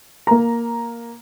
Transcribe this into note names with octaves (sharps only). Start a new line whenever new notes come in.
A#3 A#5